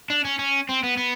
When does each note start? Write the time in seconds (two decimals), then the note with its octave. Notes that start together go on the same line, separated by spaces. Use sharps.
0.10 D4
0.25 C#4
0.39 C#4
0.69 C4
0.83 B3
0.97 B3